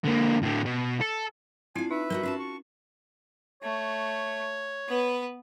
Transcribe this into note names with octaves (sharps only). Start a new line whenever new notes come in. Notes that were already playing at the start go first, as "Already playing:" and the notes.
D3 A#3
A2 D3
B2
A4
C4 D4 E4 F4 F5 G#5
D#4 B4 E5
G3 D#4 F#4 A#4
C#4 F4 F#4 A5
C#6
A3 C#5
B3 B4